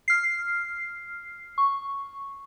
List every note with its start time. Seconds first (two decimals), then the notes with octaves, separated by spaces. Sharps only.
0.08 F6 C7
1.58 C#6